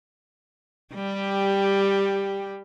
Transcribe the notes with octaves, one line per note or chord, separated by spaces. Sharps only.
G3 G4